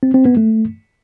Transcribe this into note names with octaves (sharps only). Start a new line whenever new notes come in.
C4
C4
B3
A3